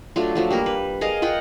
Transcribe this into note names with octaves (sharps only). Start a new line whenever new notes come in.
F#3 A3 D4 F4
F3 F#3 A3
G3 A#3 A#4
B4
G#4 A#4 D#5 F5
F4 A#4 F#5 G5